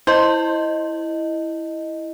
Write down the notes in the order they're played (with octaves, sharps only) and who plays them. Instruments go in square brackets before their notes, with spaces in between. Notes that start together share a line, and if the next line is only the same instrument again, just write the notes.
[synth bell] E4 D#5 [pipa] C5